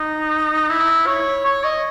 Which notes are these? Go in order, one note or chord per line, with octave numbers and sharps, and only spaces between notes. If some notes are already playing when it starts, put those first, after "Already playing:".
Already playing: D#4
E4
C#5
C#5
D#5